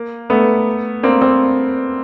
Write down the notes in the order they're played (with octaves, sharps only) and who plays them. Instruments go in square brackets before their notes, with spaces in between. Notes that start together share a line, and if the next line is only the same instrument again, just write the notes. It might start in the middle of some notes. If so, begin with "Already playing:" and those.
Already playing: [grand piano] A#3
A3 B3
A#3 C4
A#3 C4